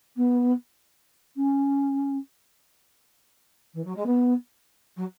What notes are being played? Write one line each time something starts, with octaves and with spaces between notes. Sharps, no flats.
B3
C#4
E3
F#3
G#3
B3
F#3